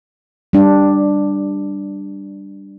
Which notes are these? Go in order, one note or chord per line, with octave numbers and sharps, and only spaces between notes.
G3 D4